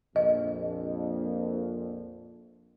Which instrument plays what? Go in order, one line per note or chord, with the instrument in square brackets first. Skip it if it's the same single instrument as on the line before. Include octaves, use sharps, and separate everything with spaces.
[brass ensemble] A#1 F2 [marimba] D#5